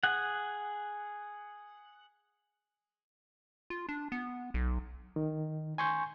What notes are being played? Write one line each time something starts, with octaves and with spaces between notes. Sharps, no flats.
G#4 F#5
F4
D4
B3
B1
D#3
G#5 C6 C#6 G6